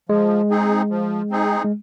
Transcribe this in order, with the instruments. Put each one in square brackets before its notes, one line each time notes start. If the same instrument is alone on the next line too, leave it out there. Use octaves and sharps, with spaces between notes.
[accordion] F3 [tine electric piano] G#3
[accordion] C4 D#4 G#4
F3
C4 D#4 G#4
[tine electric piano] G#3